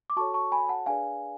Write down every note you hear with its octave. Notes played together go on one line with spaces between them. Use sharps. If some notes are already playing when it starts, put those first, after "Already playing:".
D6
F#4 A4 C#5 A5 C#6
A5 C#6
G#5 B5
F#5 A5
D4 G#4 B4 D5 F5 G#5